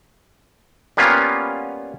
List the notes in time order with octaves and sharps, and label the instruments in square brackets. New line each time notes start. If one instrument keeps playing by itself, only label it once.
[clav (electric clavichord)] G3 A#3 B3 C#4 F4